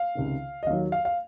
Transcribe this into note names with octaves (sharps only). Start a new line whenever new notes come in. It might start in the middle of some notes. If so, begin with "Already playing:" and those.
Already playing: F5
C#2 C3 D#3
D#5
D#2 D#3 F#3 F5
F5
F5